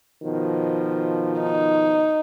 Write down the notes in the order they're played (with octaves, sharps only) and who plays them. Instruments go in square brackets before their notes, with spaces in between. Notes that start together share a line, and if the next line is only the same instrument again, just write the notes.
[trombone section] B2 D#3 F3
[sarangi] D#4